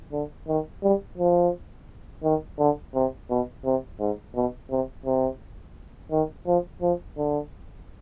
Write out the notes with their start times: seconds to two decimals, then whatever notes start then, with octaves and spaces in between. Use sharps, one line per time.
0.12 D3
0.47 D#3
0.83 G3
1.18 F3
2.24 D#3
2.59 D3
2.94 C3
3.30 B2
3.65 C3
4.00 G#2
4.35 B2
4.70 C3
5.06 C3
6.11 D#3
6.46 F3
6.82 F3
7.17 D3